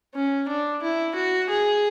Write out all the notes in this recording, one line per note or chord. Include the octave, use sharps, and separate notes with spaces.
C#4
D4
E4
F#4
G#4